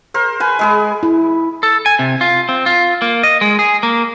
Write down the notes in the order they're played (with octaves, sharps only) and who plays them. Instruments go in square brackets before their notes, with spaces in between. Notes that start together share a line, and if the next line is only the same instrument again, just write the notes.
[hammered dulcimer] A#4 C5
B4 G#5
G#3 G#4 B4
[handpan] E4
[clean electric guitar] A4
G#5
C3
F4
C4
F4
A#3
D#5
G#3
G#4
A#3